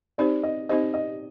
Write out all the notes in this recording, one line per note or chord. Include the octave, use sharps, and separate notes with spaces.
C4 D#4 G4 C5 D5
D#5
C4 D#4 G4 C5 D#5
D#5